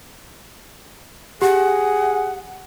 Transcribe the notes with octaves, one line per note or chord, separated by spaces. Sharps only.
G4 G#4 F#5